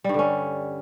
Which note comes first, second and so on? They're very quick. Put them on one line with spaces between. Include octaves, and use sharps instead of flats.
G3 G2 D3 C#4